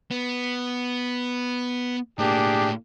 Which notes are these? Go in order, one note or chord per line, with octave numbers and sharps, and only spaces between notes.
B3
A2 A#3 D4 G4 G#4